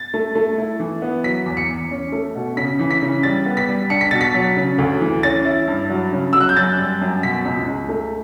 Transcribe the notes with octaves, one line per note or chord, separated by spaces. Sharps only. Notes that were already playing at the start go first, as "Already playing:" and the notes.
Already playing: A6
A3
A3
E4
E3
B3
F#3 B6
E2
C#7
E2
C#4
A3
B2
C#3 B6
E3
B6
C#3
G3 A6
B3
B6
G3
D4 C#7
B6
B2 A6
B6
F#3
C#3
D2
E3
C#4 A6
E4
G2
F#3
C#3
F#3 E6
F#6
G6
F#2 A6
G3
F#2
B2 B6
C#2
C#2
A3